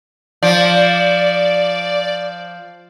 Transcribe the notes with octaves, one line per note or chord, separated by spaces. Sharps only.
F3 D5